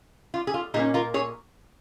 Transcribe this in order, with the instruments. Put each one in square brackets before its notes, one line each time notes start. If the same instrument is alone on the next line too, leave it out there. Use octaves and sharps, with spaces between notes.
[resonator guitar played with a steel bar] F4
G#4
F4
A#2 D#4 G#4
A#3 C#4
F4 A#4
G#4 C#5